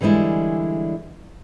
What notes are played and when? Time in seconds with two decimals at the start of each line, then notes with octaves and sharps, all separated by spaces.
0.01 D3 E3 G3 G#3 E4